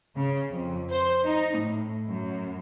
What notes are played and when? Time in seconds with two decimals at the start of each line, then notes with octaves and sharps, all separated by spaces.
0.15 C#3
0.50 F2
0.90 C5
1.25 D#4
1.57 A2
2.08 F#2